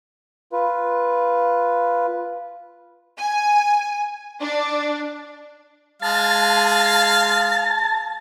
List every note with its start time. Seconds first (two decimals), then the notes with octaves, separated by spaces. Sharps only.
0.53 F4 B4
3.18 G#5
4.42 D4
6.02 G#3 F5 A5